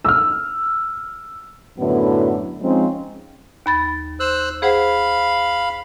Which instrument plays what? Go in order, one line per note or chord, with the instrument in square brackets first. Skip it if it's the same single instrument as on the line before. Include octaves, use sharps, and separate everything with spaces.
[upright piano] E6 F6
[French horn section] F#2 A2 D3 B3 E4 F#4
F3 G#3 C4 C#4 D#4 F4
[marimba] D#2 B5 A6
[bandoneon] C5 E6 F#6
[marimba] G#4 C5 F#5 [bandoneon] F5 B5